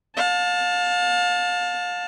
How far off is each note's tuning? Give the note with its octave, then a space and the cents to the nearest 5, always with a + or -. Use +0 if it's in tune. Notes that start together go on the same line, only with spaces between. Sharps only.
F5 +35 A5 +0